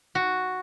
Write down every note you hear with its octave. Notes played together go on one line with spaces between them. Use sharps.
F#4